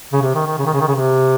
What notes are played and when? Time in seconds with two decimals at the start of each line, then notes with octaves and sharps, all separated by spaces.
0.13 C#3
0.22 C3
0.35 D#3
0.46 D#3
0.59 C#3
0.66 D#3
0.73 C#3
0.80 D#3
0.88 C#3
0.95 C3